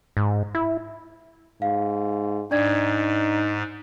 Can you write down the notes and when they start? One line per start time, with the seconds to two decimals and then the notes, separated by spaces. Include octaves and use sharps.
0.17 G#2
0.55 E4
1.62 G#2 F5
2.51 G#2 D4 D#4 D5 G#6